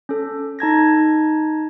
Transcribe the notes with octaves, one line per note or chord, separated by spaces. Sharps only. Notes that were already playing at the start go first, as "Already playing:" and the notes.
C#4 A4
D#4 A5 G#6 A#6